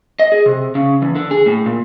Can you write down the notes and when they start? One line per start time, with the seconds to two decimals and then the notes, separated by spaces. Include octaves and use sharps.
0.19 D#5
0.32 G#4
0.46 C3
0.75 C#3
1.02 E2
1.15 D3
1.31 G#4
1.46 A2
1.66 A#2